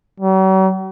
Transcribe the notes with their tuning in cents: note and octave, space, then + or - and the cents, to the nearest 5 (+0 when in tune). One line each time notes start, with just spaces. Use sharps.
F#3 +45